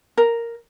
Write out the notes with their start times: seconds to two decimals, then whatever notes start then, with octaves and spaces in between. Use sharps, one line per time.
0.17 A#4